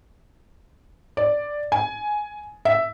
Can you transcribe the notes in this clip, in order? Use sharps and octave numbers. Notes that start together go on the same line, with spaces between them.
D5
G#5
E5